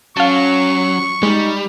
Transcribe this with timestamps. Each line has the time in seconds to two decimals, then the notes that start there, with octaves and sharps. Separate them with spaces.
0.17 F#3 C#4 F5 A5 C#6
1.23 G3 G#3 D#4